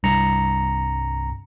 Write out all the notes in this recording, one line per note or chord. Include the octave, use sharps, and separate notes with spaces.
C2 G2 A#5 C#7